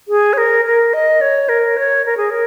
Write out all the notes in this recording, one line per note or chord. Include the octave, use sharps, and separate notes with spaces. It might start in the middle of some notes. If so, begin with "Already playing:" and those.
G#4
C#5
A#4
A#4
D#5
C#5
A#4
C#5
A#4
G#4
A#4